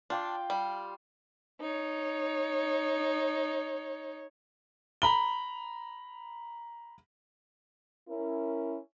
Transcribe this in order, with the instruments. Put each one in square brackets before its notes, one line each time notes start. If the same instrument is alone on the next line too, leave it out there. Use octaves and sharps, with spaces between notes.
[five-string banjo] D4 [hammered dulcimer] F4 G5 D6
[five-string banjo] G3
[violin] D#4 C#5
[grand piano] A#5 B5 G7
[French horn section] C#4 E4 A#4